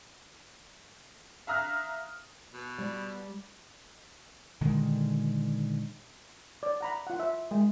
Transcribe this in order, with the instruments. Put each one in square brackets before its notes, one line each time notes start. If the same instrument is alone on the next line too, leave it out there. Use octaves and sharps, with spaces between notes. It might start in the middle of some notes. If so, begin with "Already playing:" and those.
[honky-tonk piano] E5 F5 A#5 D#6 F6 F#6
[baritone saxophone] B2
[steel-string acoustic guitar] G3
[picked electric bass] A#2 D3 D#3 G#3
[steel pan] D5
F#5 A#5 B5
F4 F#5
E5
G#3